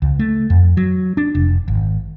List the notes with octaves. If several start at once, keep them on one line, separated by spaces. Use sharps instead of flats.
C#2
A3
F2
F#3
D4
F1
G#1